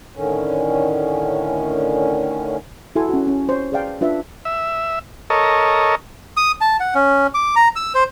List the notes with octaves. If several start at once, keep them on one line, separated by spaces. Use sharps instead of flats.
A2 D3 D#3 C#4
E4 F#4 A4 G#5 C6
C#4 F#4
C#4
C5 C#5
G#4 B4 D5 F5 G5 A5
D4 F4 B4 E5
E5
A4 A#4 C#5 D#5
D#6
A5
F#5
C#4
D6
A#5
E6
C5